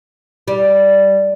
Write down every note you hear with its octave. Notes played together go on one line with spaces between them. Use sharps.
G3